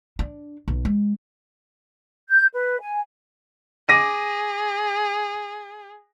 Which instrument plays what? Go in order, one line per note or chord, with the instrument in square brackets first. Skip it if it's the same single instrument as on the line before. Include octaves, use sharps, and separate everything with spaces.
[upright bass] D4
B1
G#3
[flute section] G6
B4
G#5
[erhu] G#4 [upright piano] D6 A#6 D#7